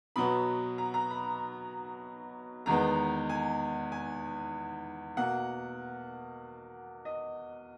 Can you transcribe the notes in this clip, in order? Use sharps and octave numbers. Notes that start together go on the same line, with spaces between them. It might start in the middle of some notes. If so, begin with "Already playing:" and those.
B2 F#3 B3 B5
A#5
A#5
B5
E2 D#3 G#3 B3 A#5
G#5
G#5
B2 A#3 F#5
D#5